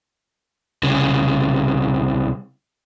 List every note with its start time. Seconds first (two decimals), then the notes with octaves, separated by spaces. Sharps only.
0.83 C2 C#3